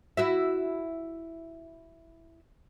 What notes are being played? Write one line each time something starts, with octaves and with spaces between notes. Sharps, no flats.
E4 F#4 E5